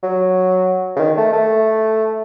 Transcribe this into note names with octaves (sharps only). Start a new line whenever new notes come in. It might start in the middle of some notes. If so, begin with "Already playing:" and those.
F#3
C#3
D#3
A3
A3